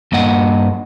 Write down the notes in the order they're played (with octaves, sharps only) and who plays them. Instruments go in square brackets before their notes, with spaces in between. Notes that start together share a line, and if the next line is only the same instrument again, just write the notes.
[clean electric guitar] G2 A#3 D#5 F#5